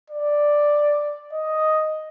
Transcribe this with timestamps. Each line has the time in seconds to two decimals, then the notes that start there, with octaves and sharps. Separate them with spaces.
0.10 D5
1.33 D#5